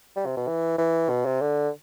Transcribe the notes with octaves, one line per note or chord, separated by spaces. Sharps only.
G3
C3
B2
E3
E3
B2
C3
D3